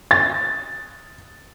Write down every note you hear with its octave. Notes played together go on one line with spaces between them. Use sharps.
A6